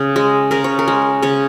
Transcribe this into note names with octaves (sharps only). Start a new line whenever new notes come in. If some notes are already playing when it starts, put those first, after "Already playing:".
Already playing: C#3
G#3
C#3 A#4
C#5
A#4
G#3
C#3 C#5